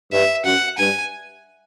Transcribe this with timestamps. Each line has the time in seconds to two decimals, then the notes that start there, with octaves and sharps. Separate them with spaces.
0.13 G2 E5
0.45 F#2 F#5
0.78 G2 G#5